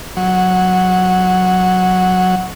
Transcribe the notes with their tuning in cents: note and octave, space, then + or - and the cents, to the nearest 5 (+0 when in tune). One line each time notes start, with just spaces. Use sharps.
F#3 -5